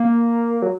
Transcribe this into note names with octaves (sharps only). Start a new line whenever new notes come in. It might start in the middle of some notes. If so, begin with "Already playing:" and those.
Already playing: A#3
F#3